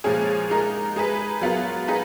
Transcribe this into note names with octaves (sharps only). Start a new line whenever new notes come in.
A#2 F3 G#3 C#4 G#4
G#3 D#4 A#4
G#3 D#4 G#4 B4
F#3 B3 F4 A#4
D#4 G#4 B4